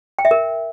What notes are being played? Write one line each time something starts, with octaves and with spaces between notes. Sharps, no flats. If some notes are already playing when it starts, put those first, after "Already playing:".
G5
E5
A#4